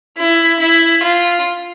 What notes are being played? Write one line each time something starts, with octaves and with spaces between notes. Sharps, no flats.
E4
E4
F4